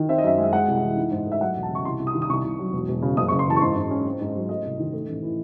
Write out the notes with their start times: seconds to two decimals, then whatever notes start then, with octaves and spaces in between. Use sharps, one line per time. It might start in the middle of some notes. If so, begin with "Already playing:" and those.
Already playing: D#3
0.09 C4 E5
0.18 D#5
0.23 F#2 E5
0.38 G#3
0.43 E5
0.53 G#3 F#5
0.68 C2
0.82 E3
0.97 D#4
1.11 G#2
1.26 A3
1.32 E5
1.41 F#3 F#5
1.56 E1
1.63 A5
1.71 C#3 C#6
1.85 C2 C6
1.99 C2
2.07 D#6
2.14 D#3
2.22 D#6
2.29 C2 C#6
2.44 C2
2.59 F#3
2.73 E1
2.88 E1
3.02 C#3
3.17 F#1 D#6
3.28 C#6
3.31 F#1
3.39 C6
3.47 E3 A5
3.57 C#6
3.61 G#2 C6
3.76 G#2
3.90 C#4
4.05 C4
4.21 G#2
4.35 F#3
4.49 A3 D#5
4.65 C2
4.79 D#3
4.93 A3
5.08 A1
5.22 E3